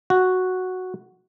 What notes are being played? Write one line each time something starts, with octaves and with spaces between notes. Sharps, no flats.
F#4